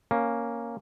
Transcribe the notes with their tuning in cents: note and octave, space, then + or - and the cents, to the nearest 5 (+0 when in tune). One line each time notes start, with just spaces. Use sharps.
A#3 +0 C#4 +0